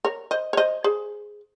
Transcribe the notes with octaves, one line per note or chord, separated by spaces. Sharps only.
A#4 C#5
C5 D#5
C#5
C5 D#5
G#4 C5